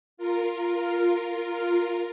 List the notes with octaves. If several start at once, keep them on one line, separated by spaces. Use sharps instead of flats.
F4 A#4